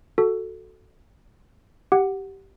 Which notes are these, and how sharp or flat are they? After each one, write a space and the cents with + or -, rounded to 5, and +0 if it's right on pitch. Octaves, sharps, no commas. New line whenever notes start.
F#4 +0 A4 +0
G4 -10 F#5 +0